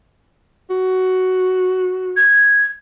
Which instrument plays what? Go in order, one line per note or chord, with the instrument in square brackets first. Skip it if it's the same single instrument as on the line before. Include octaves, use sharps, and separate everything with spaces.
[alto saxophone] F#4
[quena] G#6